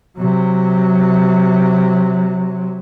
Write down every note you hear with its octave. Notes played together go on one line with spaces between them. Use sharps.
C3 F#3